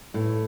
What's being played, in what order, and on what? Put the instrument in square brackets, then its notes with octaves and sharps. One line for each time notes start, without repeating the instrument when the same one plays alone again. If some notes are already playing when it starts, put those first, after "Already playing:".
[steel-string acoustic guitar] A2